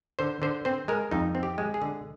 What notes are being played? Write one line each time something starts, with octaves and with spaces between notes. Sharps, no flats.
D3 C5
D3 C5
C4 C5
G#3 A#4
F2 D#4
C4
G4
G#3
G#4
D3